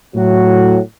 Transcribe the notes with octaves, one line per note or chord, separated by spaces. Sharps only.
A2 F#3 F#4